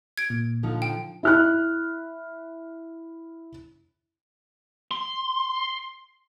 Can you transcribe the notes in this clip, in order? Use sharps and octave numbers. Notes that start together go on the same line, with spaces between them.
G#6 D7
A#2
D3 F3 D#4
G5
E4 F6 F#6
C6